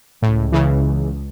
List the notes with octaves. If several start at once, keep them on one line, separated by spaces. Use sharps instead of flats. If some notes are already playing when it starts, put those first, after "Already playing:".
C#2 A2
C#3 E3